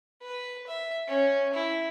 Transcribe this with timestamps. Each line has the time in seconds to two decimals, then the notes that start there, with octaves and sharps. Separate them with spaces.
0.23 B4
0.67 E5
1.08 C#4
1.54 E4